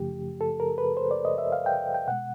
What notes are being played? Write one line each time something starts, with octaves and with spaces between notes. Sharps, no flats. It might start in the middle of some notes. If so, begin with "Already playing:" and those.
Already playing: F#2 C#3 F3 A3 G4
A4
A#4
B4
C5
D5
D#5
E5
F5
G5
G5
B2 G#3 F#5